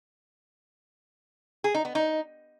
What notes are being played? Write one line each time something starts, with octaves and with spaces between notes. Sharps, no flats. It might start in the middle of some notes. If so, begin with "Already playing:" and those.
G#4
D#4
B3
D#4